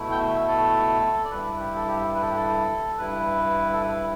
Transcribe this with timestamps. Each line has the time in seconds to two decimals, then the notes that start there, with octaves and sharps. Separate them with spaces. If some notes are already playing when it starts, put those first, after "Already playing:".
Already playing: B2 A3 E4
0.11 G5
0.20 E5
0.48 A4
1.24 D5
1.31 G2 G3 E4 B4
1.59 G4
1.75 A4
1.87 G4
2.15 B4
2.22 A4
2.28 G4
2.36 A4
2.97 G2 G3 E4 B4
3.73 A4
3.81 B4